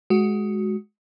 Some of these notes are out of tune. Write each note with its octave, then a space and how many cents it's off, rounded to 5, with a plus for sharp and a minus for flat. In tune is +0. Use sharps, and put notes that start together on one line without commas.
G#3 +15 F#4 +0